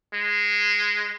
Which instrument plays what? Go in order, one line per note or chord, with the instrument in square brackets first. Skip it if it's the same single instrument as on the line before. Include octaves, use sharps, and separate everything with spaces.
[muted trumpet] G#3